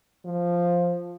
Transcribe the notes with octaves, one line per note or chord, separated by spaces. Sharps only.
F3